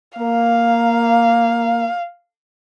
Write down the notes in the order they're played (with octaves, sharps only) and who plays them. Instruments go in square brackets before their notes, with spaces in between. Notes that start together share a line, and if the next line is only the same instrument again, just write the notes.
[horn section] A#3 [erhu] F5